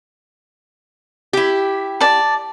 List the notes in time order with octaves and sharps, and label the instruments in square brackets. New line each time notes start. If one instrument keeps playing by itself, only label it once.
[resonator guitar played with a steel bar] E4 G4
[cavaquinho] D5 A5